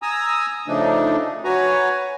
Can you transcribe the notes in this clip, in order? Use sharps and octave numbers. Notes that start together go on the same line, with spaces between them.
G#5 A#5 D#6 E6
C#3 F3 A3 D4 D#4
F#4 B4 C#5 G#5 A#5